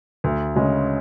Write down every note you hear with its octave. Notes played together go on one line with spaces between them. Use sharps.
D2
C#3 G#3 C#4